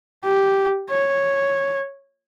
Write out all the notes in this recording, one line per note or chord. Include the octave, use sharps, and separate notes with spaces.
G4
C#5